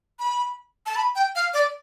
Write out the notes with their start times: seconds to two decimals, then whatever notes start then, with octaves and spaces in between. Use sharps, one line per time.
0.19 B5
0.86 A5
0.96 B5
1.15 G5
1.35 F5
1.54 D5